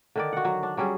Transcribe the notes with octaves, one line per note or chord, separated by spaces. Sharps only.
D3 D#3 D5
F#4 F#5
F#3
D4
F#3 G3 C#4 G#4